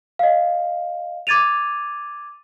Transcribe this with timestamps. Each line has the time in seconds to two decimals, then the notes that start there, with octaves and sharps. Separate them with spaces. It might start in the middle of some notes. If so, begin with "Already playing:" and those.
0.19 D#5 F5
1.27 D6 G#6 A6 D#7 F7